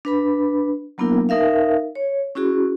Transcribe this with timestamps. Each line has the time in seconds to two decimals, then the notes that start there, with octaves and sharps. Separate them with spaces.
0.05 D4 B4 B5
0.98 F#3 A#3 B3 D4 E4 A#4
1.29 D#4 A#4 E5 F5
1.95 C#5
2.35 C#4 E4 F#4 G#4